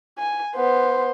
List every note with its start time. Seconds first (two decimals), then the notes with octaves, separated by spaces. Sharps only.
0.18 G#5
0.56 B3 C5